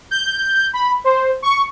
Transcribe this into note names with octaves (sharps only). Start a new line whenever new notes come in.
G6
B5
C5
C#6